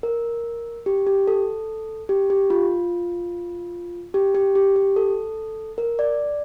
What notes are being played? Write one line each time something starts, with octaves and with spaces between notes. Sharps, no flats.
A#4
G4
G4
A4
G4
G4
F4
G4
G4
G4
G4
A4
A#4
D5